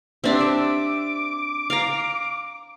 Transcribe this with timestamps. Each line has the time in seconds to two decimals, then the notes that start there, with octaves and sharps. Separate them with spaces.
0.24 C4 D4 G4 E5
0.40 E5 D6
1.70 F5 A#5